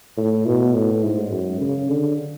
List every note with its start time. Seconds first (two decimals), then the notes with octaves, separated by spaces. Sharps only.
0.17 A2
0.46 B2
0.74 A2
1.04 G#2
1.31 F#2
1.61 C#3
1.89 D3